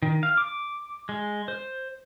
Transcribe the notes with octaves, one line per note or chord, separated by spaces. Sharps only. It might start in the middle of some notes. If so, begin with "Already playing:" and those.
D#3
F5
D6
G#3
C5